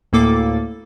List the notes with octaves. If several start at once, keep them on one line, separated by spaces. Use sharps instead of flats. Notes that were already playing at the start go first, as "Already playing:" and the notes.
D2 A2 A#3 A4 D6 A6